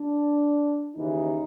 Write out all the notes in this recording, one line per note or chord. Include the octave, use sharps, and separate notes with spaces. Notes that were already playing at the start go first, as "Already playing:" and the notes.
Already playing: D4
D#2 C#3 E3 D#4